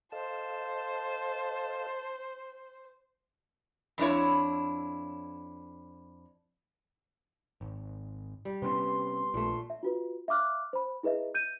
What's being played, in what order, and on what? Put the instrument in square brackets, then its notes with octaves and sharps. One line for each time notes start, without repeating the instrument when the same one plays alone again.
[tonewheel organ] A4 D#5 F5 [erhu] C5 [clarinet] A5
[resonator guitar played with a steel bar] F2 D4 E4 C#5
[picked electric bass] G#1
[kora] G3
[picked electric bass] C3 C#4 [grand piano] B3 B4 [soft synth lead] C6
[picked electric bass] A#1 [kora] A#2 A3
[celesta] E5
F4 F#4 B4
E5 F5 D6 F6 F#6
C5 B5
E4 G#4 B4 D#5 E5
G6 D#7